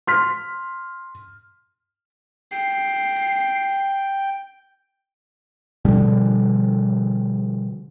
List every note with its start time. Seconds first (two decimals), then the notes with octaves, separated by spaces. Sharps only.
0.07 C6 F6 B6
2.52 G5 C7
5.85 B2 D3 F3 G3